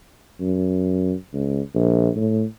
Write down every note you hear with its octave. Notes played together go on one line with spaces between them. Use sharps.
F#2
C#2
A#1
A2